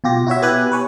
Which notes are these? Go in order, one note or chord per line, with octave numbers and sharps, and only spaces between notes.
B2 F4 G4 A#6
E4 F#4 C#5 E5
B3 G4 B4 G#5 F#6
B4 C#5 G#5